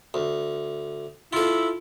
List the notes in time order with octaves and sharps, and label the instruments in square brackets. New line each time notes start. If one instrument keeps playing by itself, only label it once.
[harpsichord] D2
[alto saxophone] E4 [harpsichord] F4 A4